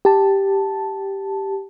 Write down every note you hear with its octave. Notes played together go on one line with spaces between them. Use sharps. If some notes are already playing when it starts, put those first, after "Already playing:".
G4 A5